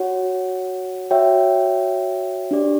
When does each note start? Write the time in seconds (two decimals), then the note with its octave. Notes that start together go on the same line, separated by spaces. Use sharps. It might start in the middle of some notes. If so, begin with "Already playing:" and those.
Already playing: F#4 C#5 F#5
1.11 F#4 C#5 E5 G5
2.51 D4 G4 D5